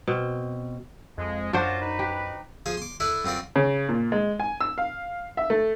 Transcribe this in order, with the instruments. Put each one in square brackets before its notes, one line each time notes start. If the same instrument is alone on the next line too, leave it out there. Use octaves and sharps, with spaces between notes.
[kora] B2 C4
[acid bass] F2 [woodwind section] G#3
[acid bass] F#2 [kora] D4 F#4 C5 [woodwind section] F4
[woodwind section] D#4 B4
[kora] G4
[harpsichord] F3 G#4 F5
C6 D6
D4 E4 A4 B4 D5
F#2 C4 F4 A#4 D5
[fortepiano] C#3
A#2
G#3
G#5
E6
F5
E5
A3